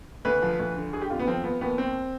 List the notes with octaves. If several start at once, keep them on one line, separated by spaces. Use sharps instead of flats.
D2 B4
F3
D2
D3
D3 G#4
G4
F2 F4
B3
F3 C4
F3 B3
D#2 B3
D#2 C4